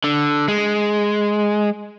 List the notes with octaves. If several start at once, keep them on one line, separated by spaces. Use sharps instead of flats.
D3
G#3